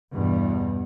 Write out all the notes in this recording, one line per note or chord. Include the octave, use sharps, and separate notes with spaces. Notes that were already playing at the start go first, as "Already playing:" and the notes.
E2 G2 B2